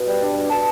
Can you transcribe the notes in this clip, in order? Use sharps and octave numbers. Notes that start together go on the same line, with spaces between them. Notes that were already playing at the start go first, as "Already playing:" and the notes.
Already playing: B2
G3
D4
B2
B2 A5